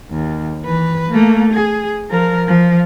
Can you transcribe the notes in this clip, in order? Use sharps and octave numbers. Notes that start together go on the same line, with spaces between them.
D#2
E3 B4
A3 A#3
G#4
F3 A#4
F3